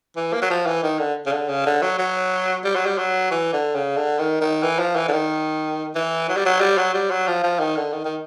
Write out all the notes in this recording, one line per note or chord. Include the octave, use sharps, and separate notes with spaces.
E3
A#3
F#3
F3
E3
D#3
D3
C#3
D3
C#3
D3
F#3
F#3
G3
F#3
G3
F#3
E3
D3
C#3
D3
D#3
D#3
E3
F3
E3
D3
D#3
E3
F#3
G3
F#3
G3
F#3
G3
F#3
F3
F3
D#3
D3
D#3
D#3